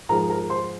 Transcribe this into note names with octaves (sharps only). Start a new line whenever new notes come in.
G#2 F3 G#3 A#4 A#5
A#4 A#5
C5 C6